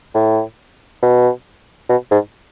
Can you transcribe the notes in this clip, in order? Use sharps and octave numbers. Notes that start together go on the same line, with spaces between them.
A2
B2
B2
G#2